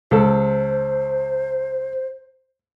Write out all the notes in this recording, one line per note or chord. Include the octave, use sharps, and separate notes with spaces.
C#2 A4 C5